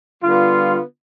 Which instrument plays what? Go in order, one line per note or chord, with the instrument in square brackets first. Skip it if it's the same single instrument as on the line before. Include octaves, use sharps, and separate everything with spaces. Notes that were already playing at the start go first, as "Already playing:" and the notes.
[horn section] D3 G3 B3 F4